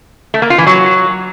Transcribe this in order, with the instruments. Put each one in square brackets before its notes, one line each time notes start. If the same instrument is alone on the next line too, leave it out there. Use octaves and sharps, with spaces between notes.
[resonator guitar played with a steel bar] A3
A#3
F4
E3
F#3